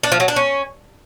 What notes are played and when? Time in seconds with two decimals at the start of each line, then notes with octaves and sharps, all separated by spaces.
0.03 D4
0.12 F3
0.20 F#3
0.28 D4
0.36 C#4